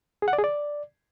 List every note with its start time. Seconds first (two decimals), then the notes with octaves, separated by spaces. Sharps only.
0.22 G#4
0.28 F#5
0.33 D5
0.38 G#4
0.44 D5